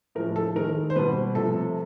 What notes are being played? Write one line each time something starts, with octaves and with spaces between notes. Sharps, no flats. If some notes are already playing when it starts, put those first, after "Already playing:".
A2 F3 G#3 A#4
A4
D#3 G#3 A#4
C5
B2 G3 A#3 B4
C3 F3 A3 A4